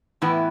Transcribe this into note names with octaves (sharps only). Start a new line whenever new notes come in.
A2 E3 B3 E4 B4